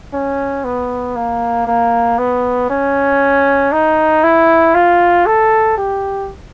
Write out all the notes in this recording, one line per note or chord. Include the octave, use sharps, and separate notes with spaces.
C#4
B3
A#3
A#3
B3
C#4
D#4
E4
F4
A4
G4